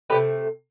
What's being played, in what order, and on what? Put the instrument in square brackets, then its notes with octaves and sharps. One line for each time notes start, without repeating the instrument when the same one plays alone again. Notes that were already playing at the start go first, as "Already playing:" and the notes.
[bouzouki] C3 F3 A3 G4 B4